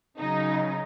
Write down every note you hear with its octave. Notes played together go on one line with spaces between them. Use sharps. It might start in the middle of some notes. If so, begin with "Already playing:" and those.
C#3 F#3 D#4